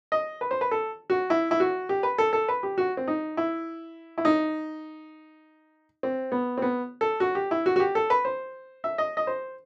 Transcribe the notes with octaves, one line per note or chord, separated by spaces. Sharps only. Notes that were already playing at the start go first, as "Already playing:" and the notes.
D#5
B4
C5
B4
A4
F#4
E4
E4
F#4
G4
B4
A4
A4
B4
G4
F#4
C4
D#4
E4
E4
D#4
C4
B3
C4
B3
A4
F#4
G4
E4
F#4
F#4
G4
A4
B4
C5
E5
D#5
D#5
C5